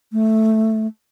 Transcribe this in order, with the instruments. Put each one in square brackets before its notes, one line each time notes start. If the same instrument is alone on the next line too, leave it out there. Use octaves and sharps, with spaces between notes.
[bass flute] A3